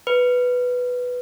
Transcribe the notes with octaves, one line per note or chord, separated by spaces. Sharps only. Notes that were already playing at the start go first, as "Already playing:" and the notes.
B4